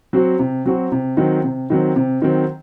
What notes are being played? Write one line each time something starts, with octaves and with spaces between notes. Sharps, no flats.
F#3 C4 F#4
C3
F#3 C4 F#4
C3
D#3 F#3 C4
C3
D#3 F#3 C4
C3
D#3 F#3 C4